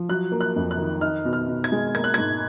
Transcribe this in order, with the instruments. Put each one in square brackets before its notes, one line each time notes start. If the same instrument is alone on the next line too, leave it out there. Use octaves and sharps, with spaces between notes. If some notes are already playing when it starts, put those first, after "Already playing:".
Already playing: [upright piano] F3
F#3 F#6
A#3
F#6
F2
F#6
D#3
D#4 F6
B2
F6
B2
G#6
G#3
A#3 G#6
F#6
G#2 G#6